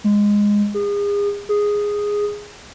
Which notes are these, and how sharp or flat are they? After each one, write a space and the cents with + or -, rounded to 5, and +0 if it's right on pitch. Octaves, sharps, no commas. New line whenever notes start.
G#3 -10
G#4 -35
G#4 -5